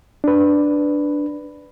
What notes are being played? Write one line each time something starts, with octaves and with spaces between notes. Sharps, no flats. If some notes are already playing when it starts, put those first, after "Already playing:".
D4 B4